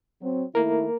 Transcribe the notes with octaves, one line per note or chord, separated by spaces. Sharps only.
F#3 C4
D#3 A3 A#3 E4 A#4